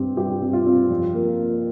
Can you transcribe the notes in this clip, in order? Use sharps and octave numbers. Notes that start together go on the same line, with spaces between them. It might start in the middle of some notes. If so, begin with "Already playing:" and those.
Already playing: G2 C4 G4
G2 G4
C4
F4
C4
F2
A#3
A#3